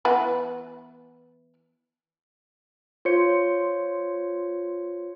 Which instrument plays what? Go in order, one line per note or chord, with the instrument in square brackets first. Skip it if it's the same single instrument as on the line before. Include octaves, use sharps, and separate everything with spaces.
[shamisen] E3 B3 B4
[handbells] F4 C5 C#5 C#7